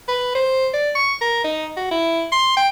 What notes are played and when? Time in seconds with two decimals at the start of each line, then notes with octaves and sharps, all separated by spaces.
0.08 B4
0.35 C5
0.73 D5
0.95 C#6
1.21 A#4
1.44 D#4
1.77 F#4
1.91 E4
2.32 C6
2.57 G5